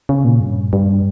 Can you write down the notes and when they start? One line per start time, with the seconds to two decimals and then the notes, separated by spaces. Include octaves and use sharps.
0.09 C#3
0.25 A#2
0.40 G2
0.73 G2